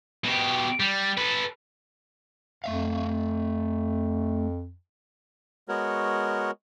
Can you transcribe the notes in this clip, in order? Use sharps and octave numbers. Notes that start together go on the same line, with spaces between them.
B2 G4
G3
A4 B4
F2 A3 E5 F5
G#3 B3 F#4 A#4 C#5